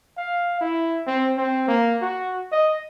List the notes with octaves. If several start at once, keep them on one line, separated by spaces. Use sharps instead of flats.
F5
E4
C4
C4
A#3
F#4
D#5